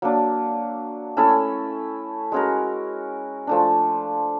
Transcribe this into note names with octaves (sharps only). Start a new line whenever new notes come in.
F#3 A#3 D4
A3 C#4 E4 A4
G#3 C#4 F#4 A#4
F3 A3 D4